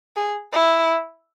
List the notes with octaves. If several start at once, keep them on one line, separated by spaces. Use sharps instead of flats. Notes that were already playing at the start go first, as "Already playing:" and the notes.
G#4
E4